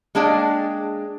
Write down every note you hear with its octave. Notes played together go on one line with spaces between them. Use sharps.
G#3 A#3 D4 G#4 D5 G5